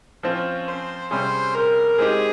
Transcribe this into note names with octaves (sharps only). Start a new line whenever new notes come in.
F3 C4 C#4 F4
C5
C3 G3 C#4 G#4 C5 C#5
A#4
G#3 C4 D#4 G4 G#4